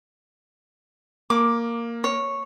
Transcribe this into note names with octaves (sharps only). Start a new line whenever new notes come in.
A#3 D6
C#5